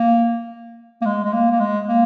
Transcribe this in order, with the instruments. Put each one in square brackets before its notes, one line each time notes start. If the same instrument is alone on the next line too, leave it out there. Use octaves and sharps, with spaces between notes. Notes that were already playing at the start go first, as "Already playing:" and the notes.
Already playing: [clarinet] A#3
A#3
G#3
G#3
A#3
A#3
G#3
A#3